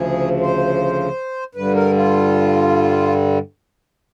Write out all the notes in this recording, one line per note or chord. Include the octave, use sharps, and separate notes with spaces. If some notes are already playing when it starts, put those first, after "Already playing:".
Already playing: D2 C#3 F3 G#4
C5
G2 D3 G3 B4
A#4
F4